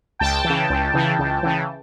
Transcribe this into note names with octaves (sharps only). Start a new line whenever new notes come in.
C#2 G5 A5
E3
C#3
C#2
C#3 E3
C#2
C#3 E3